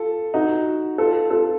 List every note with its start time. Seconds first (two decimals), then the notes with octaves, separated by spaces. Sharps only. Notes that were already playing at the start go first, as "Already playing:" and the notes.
Already playing: F4 A4
0.34 D#4 F#4
0.98 F4 A4
1.30 F4 A4